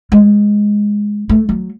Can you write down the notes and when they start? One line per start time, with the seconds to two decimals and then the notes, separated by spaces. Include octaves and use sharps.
0.12 G#3
1.29 A3
1.49 F#3